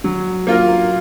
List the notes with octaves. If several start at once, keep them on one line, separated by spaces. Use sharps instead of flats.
F#3
A#3 F4 A#4